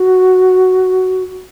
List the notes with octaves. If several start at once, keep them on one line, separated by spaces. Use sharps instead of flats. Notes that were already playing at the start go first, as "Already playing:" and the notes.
Already playing: F#4